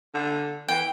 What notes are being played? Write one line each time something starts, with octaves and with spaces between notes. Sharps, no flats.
D3
E3 G5